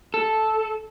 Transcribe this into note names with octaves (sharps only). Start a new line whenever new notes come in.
A4